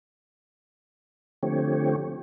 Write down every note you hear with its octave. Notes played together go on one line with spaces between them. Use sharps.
D3 F3 A3 C4 G4 C#5